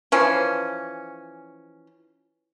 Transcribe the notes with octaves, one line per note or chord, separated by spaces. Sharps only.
E3 F3 C#4